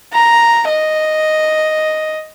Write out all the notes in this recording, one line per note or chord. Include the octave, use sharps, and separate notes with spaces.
A#5
D#5